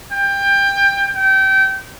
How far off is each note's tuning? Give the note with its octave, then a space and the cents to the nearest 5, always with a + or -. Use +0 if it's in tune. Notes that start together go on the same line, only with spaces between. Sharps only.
G5 +20
G5 -25